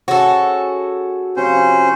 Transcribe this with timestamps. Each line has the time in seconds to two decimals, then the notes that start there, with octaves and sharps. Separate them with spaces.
0.08 C#4 F#4 G#4 A4 C#5
1.37 C3 F3 C#4 C5